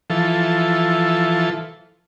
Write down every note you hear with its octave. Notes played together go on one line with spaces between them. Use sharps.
E3 F3 A4